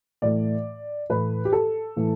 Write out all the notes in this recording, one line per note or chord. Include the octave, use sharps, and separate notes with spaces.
A2 E3 A3 D5
A2 E3 A3 B4
G4
A4
A2 E3 A3